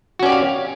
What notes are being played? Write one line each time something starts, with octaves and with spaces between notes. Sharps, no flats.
C#4 F#4 G4 D5 F5